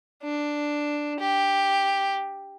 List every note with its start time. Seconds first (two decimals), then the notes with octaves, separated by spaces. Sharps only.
0.23 D4
1.20 G4